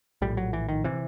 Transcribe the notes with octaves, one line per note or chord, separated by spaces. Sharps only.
A#1 A2 G3
F#3
E3
D#3
C3 E3